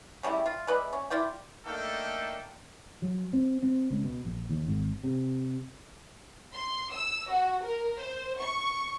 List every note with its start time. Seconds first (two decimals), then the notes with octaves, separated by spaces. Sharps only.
0.23 C#3 G3 A3 E4
0.46 F4
0.67 G#3 B4 D5 E5
0.93 C#4
1.10 E4 F4 D5 G5
1.66 A3 A#3 D4 D#4 A4 G5
3.02 F#3
3.33 C4
3.63 C4
3.90 C#2
4.04 B2
4.25 A#1
4.49 D#2
4.67 G#1
5.03 C3
6.54 C6
6.92 E6
7.30 F#4
7.62 A#4
7.98 C5
8.40 C#6